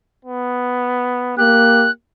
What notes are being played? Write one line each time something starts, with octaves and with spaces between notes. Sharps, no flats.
B3
A#3 G4 F#6